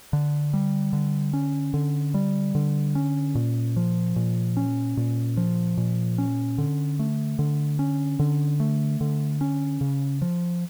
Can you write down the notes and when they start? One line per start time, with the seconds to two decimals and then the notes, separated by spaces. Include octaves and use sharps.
0.13 D3
0.53 G3
0.93 D3
1.33 C#4
1.74 D3
2.14 G3
2.55 D3
2.95 C#4
3.35 A#2
3.77 F3
4.16 A#2
4.57 C#4
4.97 A#2
5.37 F3
5.77 A#2
6.18 C#4
6.58 D3
6.99 A3
7.39 D3
7.79 C#4
8.19 D3
8.60 A3
9.01 D3
9.41 C#4
9.81 C#3
10.22 F3